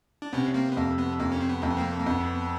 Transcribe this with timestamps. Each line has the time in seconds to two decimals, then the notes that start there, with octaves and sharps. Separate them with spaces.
0.22 D4
0.33 C3 B3 C#4
0.54 A#3 C4
0.72 B3
0.77 F2 A#3
0.98 B3
1.19 F2 A#3
1.32 C#4
1.41 C4
1.49 B3
1.62 F2 A#3
1.70 B3
1.77 A#3 C4
2.00 A#3
2.06 F2 B3